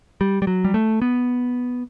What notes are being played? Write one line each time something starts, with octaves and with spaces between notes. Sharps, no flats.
G3
G3
F#3
G3
A3
B3